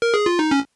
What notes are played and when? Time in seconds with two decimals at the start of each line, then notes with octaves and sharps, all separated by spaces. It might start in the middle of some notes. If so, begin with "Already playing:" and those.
0.02 A#4
0.14 G#4
0.26 F4
0.39 D#4
0.51 C#4